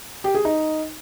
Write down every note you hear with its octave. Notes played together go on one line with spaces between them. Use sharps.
G4
G#4
D#4